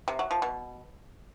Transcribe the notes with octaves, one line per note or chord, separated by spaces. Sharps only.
C3
F#3
F3
B2